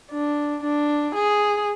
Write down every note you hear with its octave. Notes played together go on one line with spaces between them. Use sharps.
D4
D4
G#4